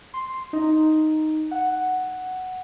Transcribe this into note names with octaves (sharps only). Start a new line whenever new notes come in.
C6
D#4
F#5